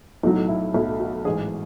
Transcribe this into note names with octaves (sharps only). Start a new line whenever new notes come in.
B1 A2 F#3 D#4
E4
B1 A2 F#3 E4
F#4
A1 G#2 E3 G#4